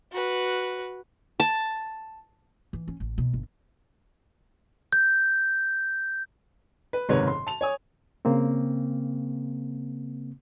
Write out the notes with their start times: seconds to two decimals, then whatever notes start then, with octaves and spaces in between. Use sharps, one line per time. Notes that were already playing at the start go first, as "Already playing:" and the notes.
0.12 F#4 B4
1.40 A5
2.73 E3
2.88 C#4
3.00 A1
3.18 B2
3.33 G1
4.93 G6
6.93 B4
7.09 F#1 G#2 C3 D#3 B4 C#5
7.28 C6
7.47 A5 F7
7.61 C#5 G#5 D#6
8.25 C#3 A#3 C4